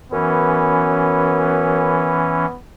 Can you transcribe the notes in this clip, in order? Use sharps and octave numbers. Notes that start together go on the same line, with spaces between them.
F#2 E3 B3 C#4